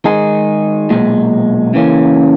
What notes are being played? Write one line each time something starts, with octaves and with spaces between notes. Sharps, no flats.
D#3 G#3 D#4 G#4
B1 A#2 G#3
C#3 E3 A#3 C#4